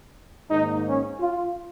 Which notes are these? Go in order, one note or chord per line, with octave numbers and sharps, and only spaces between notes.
G#2 D#3 A#3 D#4
C#4
F4